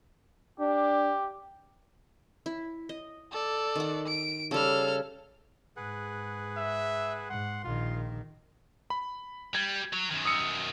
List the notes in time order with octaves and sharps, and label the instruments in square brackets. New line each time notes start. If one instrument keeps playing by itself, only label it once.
[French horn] D4 [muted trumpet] G4
[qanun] E4
D#5
[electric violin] A4 D5
[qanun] D#3 F#5
[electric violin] D7
[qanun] C#3 G3 [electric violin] A4 F6
[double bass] G#2 [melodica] G#4 B4 F#5
[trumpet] E5
[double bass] G#2 [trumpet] F#5 [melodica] C6
[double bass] A#1 D#3 [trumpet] F4
[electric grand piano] B5
[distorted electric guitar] G3 [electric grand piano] G#6
[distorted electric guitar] F#3
F#2 D#3
[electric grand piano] D#6 E6 C#7